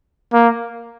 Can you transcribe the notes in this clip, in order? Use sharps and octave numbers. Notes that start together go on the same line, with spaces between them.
A#3